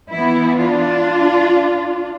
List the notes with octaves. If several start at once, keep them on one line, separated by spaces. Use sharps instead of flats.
E3 B3 E4
D4 F4